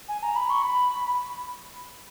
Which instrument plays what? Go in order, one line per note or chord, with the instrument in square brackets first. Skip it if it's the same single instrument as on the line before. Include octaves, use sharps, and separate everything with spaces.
[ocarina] G#5
A#5
B5
C#6
B5